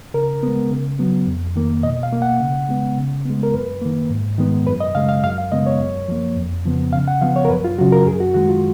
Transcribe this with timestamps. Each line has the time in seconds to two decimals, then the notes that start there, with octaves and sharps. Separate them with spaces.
0.14 C#3 A#4
0.43 G#3 B3
0.71 C#3
0.99 F#3 B3
1.27 F2
1.56 D#3 A#3
1.83 B2 D#5
2.03 F5
2.12 A#3
2.22 F#5
2.41 C#3
2.69 G#3 B3
2.97 C#3
3.25 G#3 B3
3.43 A#4
3.54 F#2 B4
3.82 D#3 A#3
4.10 G#2
4.38 D#3 G#3 B3
4.67 F#2 B4
4.80 D#5
4.95 C#3 G#3 F5
5.09 F5
5.24 F#2 F5
5.38 F5
5.52 C#3 G#3 B3 D#5
5.66 C#5
5.80 F#2
6.08 F3 A#3
6.37 F2
6.65 C#3 F3 B3
6.93 C#3 F5
7.08 F#5
7.21 F3 B3 F5
7.36 C#5
7.45 A#4
7.50 F#2 B4
7.64 F4
7.78 C#3 F#3 F#4
7.92 A#4
8.06 F#2 G#4
8.20 F#4
8.34 D#3 G#3 F#4
8.49 F4